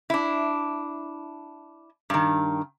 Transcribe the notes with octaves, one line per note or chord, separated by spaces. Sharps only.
D4 E4
G2 D#3